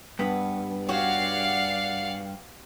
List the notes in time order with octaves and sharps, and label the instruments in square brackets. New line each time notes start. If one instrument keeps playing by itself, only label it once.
[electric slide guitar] G2 [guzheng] B3 B5
[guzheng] F#4 G4 C#5 [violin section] D5 F5 F#5